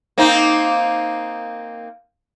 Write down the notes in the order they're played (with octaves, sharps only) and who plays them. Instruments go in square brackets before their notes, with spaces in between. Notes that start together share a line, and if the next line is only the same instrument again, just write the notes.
[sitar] A#3 C4 D#4